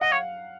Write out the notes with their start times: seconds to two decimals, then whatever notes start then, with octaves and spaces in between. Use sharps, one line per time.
0.01 D#5 F#5
0.11 C#5 F5